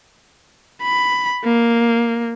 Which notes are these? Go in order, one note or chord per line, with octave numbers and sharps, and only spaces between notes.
B5
A#3